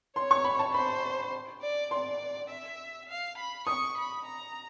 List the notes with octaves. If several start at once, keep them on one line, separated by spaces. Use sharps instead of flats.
C#5 C6
C#6
B5
A5
C5 B5
D5
D5 C6
E5
F5
B5
C#6 D#6
B5
A#5